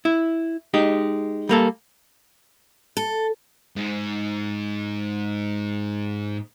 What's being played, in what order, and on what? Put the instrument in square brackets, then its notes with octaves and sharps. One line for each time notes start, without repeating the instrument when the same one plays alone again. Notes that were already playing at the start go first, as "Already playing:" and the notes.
[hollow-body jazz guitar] E4
G#3 D#4 G4
G3 A#3 A4
[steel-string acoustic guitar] A4
[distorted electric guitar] G#2 G#3